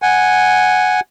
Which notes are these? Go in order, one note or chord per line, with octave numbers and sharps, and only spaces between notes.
F#5 G#5